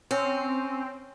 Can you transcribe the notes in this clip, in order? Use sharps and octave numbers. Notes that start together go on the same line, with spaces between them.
C4 C#4